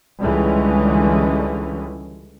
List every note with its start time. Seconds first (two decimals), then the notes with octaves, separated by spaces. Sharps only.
0.22 C#2 D3 E3 G3 G#3 C#4